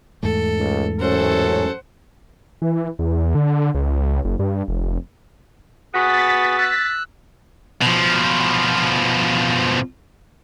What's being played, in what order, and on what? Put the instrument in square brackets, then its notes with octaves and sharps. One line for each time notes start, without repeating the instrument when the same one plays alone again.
[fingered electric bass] E2 G#2 A3 [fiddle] A4
[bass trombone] C#2
[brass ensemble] A1 C#4 A4 [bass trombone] F#2 [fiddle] C5 F#5
[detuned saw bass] E3
E2
D3
C#2
F#1
G2
F1
[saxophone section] B3 F#4 [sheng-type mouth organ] G#4 [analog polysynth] A6 B6
[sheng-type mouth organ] E6 F#6
[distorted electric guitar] B2 F3